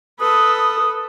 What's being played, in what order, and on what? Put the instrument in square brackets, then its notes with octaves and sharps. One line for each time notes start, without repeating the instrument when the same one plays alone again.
[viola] A4 B4 [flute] D#6